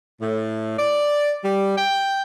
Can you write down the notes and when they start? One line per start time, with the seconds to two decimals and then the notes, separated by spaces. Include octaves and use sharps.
0.21 A2
0.77 D5
1.44 G3
1.76 G5